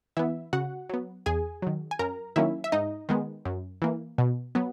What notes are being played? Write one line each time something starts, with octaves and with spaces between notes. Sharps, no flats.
E3 B3 E4 E5
C#3 F#4 F#5
F#3 B3
E2 G#4 G#5
D#3 F#3
G#5
F#2 A#4 A#5
D#3 F#3 A#3 C#4 E4 E5
E5
G#2 D#4 D#5
D#3 G#3 B3
F#2
E3 A#3
B2
F#3 B3